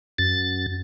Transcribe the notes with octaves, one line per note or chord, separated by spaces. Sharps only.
F#2 A6